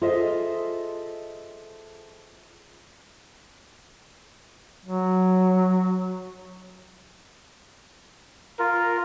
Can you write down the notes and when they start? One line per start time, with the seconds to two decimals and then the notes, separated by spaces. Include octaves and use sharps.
0.01 F4 G#4 A4 C5 D#5 E5
4.86 F#3
8.59 F4 A#4